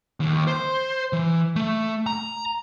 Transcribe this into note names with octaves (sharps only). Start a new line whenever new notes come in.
D#2
C5
E3
A3
A#5